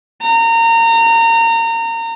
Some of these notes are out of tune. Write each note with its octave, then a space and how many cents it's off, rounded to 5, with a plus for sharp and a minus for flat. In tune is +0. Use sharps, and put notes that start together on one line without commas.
A#5 -30